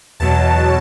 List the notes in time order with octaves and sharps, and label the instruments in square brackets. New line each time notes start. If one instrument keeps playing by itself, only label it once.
[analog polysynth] E2 B2 F#3 A5